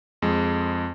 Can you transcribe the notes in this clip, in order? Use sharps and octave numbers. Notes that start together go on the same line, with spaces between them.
F2 G#3